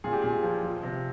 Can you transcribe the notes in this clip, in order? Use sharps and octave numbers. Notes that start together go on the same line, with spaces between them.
A#2 G#4
G4
A#2 G#4
F3
F3
C3